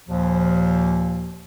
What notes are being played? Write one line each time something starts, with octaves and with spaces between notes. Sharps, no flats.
D#2 A#2 F3